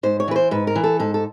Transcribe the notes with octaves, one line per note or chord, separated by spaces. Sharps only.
G#2 C5
C#5
E3 B4
C5
G#2 B4
A#4
E3
A4
G#2 A4
A4